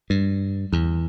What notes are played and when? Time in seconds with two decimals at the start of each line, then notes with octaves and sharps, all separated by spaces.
0.10 G2
0.73 E2